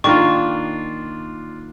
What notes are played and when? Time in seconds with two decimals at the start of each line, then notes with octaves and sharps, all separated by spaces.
0.04 D#3 A#3 D4 F4 C#6